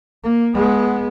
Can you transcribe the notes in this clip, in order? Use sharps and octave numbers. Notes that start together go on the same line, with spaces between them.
A#3
G#3 B3